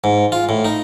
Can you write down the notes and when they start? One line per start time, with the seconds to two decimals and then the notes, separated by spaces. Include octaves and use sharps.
0.04 G#2
0.32 F4
0.49 A2
0.65 D#4